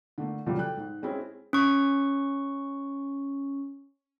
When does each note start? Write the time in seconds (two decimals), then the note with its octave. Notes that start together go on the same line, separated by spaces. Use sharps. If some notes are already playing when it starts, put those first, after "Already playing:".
0.18 D3 A3 A#3
0.46 F2 A#2 C#3 E3 F#3 G3
0.58 A4 G5 F#6
0.77 G#2
1.02 G#3 C4 C#4 E4 G#4
1.53 C#4 C#6